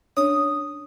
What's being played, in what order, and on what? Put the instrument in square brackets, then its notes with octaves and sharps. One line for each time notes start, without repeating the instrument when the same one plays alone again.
[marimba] C#4 D4 C#5 [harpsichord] D#6